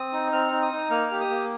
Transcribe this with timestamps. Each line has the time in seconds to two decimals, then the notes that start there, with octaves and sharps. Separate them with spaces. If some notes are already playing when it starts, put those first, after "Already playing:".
Already playing: C4 D#6
0.13 D#4
0.32 C4 F6
0.52 D#4
0.62 D#6
0.72 D#4
0.90 A#3 F6
1.11 G4
1.20 D#6
1.30 A#3